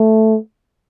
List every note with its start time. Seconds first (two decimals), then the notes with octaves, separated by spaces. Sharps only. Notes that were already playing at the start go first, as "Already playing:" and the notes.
Already playing: A3